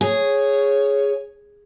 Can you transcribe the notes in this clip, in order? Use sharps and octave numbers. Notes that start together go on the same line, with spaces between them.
G#4 C#5